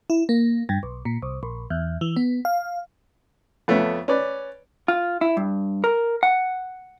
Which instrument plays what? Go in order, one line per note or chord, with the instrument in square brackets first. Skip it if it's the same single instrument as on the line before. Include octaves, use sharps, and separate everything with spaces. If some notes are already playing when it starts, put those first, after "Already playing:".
[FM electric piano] E4
A#3
G2
B1
A#2
C2
A#1
E2
E3
B3
F5
[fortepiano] F2 A3 B3 C#4
C#4 B4 D5
[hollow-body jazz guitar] F4
E4
G2
A#4
F#5